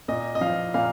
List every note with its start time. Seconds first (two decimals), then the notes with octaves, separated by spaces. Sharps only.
0.08 A#2 D#5
0.35 D#5
0.41 F3 F5
0.74 A#2 F5